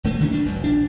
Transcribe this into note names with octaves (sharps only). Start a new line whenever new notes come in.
E1 A3 A#3
D3 D#3 B3 C#4
C#2 G3 D4
F1 F#2
A#1 D4